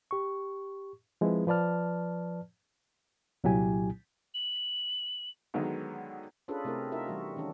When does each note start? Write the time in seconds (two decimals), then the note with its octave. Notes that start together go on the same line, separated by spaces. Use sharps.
0.11 G4 C#6
1.21 F3 G#3 C4 E4 G#4 B4
1.47 F3 B4 D5 A5 F6
3.44 C2 A#2 F#3 E4 G4 G#5
4.34 F#7
5.54 D3 D#3 F#3 G#3 B3 D#4
6.48 C#4 D4 F4 G#4 A4 B4
6.64 C3 A3 C4 E4 A#4
6.92 D#4 F4 F#4 A#4 E5
7.07 E3 G3 F#4
7.36 D#3 E3 C#4 D4